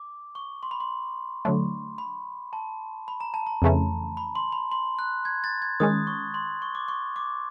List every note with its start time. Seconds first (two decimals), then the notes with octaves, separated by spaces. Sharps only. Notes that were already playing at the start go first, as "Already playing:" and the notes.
Already playing: D6
0.35 C#6
0.63 C6
0.71 B5
0.80 C6
1.45 D3 F#3 A3 D4
1.98 B5
2.53 A5
3.08 B5
3.20 A#5
3.34 A5
3.47 A#5
3.62 F2 C#3 E3 A3 C#4
4.17 B5
4.35 C6
4.52 B5
4.72 C6
4.99 F#6
5.25 G#6
5.44 A6
5.62 G#6
5.80 D#3 G#3 C#4 D#6
6.07 C#6
6.34 C6
6.62 C#6
6.75 D6
6.88 C#6
7.16 D6